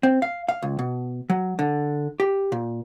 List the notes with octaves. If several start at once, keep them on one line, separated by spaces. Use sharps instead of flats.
C4
F5
F5
C#2
B2
F#3
D3
G4
A#2